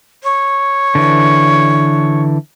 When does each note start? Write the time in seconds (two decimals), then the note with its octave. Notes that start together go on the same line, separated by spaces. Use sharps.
0.23 C#5
0.95 D3 E3